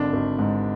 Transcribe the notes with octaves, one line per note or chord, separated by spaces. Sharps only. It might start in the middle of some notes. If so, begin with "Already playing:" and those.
Already playing: G#1 D3 D4
G#1
G#2